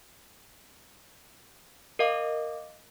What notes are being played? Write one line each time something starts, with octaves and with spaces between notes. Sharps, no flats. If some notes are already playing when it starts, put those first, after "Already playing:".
A#4 D#5 F5 D6